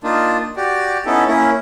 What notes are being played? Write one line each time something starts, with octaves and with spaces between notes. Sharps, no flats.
A#3 D4 D#4 F4
F#4 G4 D5
B3 C#4 D#4 E4 A4
A#3 C#4 E4